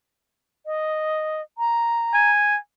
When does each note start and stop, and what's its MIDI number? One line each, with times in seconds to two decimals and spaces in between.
0.66 1.41 75
1.58 2.30 82
2.14 2.58 80